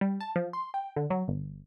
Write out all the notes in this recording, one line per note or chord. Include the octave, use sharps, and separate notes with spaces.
G3
A5
F3
C6
G5
D3
F#3
G1